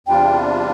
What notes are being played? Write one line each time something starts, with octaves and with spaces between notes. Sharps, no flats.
E2 C3 G3 D4 F4 G5